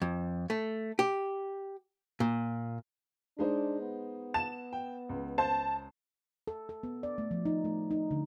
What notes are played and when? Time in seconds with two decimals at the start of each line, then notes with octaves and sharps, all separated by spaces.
0.02 F2
0.50 A3
0.99 G4
2.20 A#2
3.39 G#3 D4 D#4 C5
3.81 B3
4.34 A5 E7
4.73 G5
5.09 C#2
5.38 C5 A5
6.48 A4
6.69 A4
6.83 B3
7.03 D5
7.18 A3
7.31 F3
7.46 D#4
7.65 A3
7.91 D#4
8.11 D3